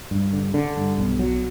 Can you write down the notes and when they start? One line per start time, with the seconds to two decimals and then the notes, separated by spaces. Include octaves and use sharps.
0.11 G2
0.33 D3
0.54 D3
0.76 G2
0.98 B1
1.19 F#3